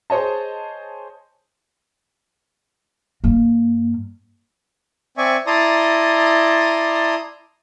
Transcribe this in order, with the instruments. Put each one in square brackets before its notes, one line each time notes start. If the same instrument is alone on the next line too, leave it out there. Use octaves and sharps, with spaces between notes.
[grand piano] G#4 C5 C#5 D#5 A5
[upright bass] G2 A#3
[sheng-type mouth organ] C4 D5 E5 G#5 C#6
E4 D5 A5 A#5 C6 D#6